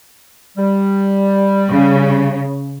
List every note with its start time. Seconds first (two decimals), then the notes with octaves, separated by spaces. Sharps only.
0.58 G3
1.71 C#3